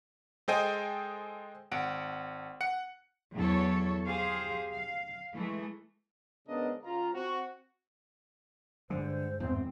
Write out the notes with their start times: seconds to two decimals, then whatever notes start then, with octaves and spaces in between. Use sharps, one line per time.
0.48 G#3 A4 C5 D#5 G5 G#5
1.72 G#1 F#5 D7
2.61 F#5 C#7
3.35 E2 F#3 A4 C#5
4.06 G4 G#4 C5 F5
4.73 F5
5.34 E3 G#3 A3
6.48 G#2 C#3 B3 D4 A#4 D#5
6.83 C#2 F4 A#5
7.13 C4 F#4
8.90 G2 D3 G#3 C5
9.40 G#1 E2 C4